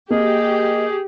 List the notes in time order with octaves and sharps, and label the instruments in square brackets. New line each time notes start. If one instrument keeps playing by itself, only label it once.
[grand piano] A#3 [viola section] G4 [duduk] G#4 [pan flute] D#5